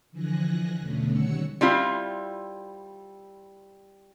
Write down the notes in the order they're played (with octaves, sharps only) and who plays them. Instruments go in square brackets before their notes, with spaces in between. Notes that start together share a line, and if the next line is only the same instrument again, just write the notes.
[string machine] D3 E3 F3 G#5 F#6 A#6
E2 B2 D3 A3 C#4
D#3 G3 C#5 F#5 E6 C#7
[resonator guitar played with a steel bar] G3 C4 E4 F4